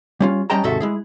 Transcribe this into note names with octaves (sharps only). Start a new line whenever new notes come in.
G3 C#4 F4
G3 C#4 D#5 G5 A5 A#5
D#2 G#2 C3 F#4 A4 E5
G#3 E4 G#4